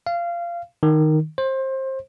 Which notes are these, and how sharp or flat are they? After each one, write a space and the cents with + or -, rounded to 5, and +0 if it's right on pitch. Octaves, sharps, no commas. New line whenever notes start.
F5 -20
D#3 -5
C5 +25